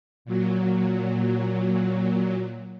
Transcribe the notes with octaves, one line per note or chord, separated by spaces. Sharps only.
A#2 F#3